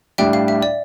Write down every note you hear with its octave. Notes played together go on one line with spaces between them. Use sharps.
A2 G3 D4 E5 G5
F5
E5
D5